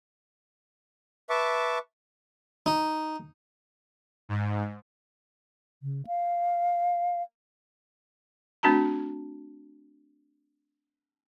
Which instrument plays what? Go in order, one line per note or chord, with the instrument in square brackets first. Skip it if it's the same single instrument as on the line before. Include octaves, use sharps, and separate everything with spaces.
[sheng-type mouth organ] B4 E5 A5 C#6 D6
[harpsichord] D#4
[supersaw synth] G#2
[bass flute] C#3
F5
[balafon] A3 C4 D4 F#4 A5 A#5